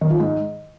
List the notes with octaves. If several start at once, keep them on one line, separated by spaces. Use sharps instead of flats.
D#3
F3
G#2